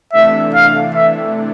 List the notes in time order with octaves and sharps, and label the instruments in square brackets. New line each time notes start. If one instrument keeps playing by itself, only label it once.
[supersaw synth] C3 E3 A3 D4 [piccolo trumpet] E5
[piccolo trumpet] F5
E5